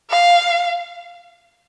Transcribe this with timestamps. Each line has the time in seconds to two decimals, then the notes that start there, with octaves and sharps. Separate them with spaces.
0.10 F5